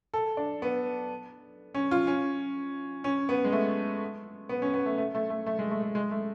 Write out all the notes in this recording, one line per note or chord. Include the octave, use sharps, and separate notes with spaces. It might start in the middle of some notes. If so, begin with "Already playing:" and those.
A4
D4
B3
C#4
F4
C#4
C#4
B3
G#3
A3
B3
C#4
B3
A3
A3
A3
A3
A3
G#3
A3
A3
G#3
A3